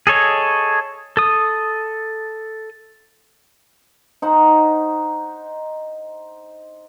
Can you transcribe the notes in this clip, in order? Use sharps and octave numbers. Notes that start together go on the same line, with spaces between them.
G#4 A4 C#5 D#5
A4 D#6
D#4 C5 F#5 C6